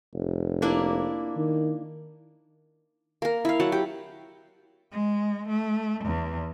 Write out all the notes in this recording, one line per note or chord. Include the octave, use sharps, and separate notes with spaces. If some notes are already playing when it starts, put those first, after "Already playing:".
F1
A#3 D4 E4
D#3
A#3 A#4
E4 F5
F#3 F#5 A5
G4
G#3
A3
E2